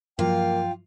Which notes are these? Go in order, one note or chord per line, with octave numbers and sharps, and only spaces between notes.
G2 F3 F#3 A#3 F4 G5